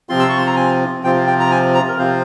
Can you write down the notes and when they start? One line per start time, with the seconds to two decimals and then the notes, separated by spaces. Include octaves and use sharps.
0.09 C3 F3 C4 F4 C6
0.19 E6
0.29 C#6
0.38 C6
0.47 A#5
0.56 G#5
1.04 C3 F3 C4 F4 G5
1.27 G5
1.40 A#5
1.51 G#5
1.74 A#5
1.88 A#4
1.98 C3 F3 C4 F4 C5